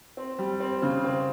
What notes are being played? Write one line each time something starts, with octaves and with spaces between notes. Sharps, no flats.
C4
G3
C4
C#3
C4